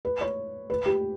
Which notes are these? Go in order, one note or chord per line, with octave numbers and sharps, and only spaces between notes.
B4
C#5
B4
G4